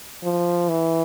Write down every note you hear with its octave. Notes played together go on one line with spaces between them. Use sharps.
F3
E3